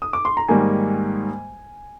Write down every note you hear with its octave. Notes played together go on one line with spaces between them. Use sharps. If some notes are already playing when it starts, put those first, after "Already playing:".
D#6
D6
C6
A#5
G#2 D#3 G3 A#3 D#4 G#5